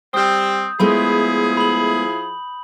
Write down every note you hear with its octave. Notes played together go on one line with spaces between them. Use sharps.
G3 C4 D#6 G6
F3 G#3 A3 B3 E4 G#4 B5
B5 F#7